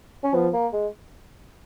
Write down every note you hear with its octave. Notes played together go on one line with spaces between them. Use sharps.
C#4
F3 B3
A#3
G#3